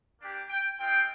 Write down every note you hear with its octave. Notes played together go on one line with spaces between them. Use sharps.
A#3 D4 G4
G5
G#3 C4 F4 G5